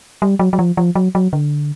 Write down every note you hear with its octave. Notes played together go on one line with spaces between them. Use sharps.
G3
F#3
F#3
F3
F3
F#3
F#3
D3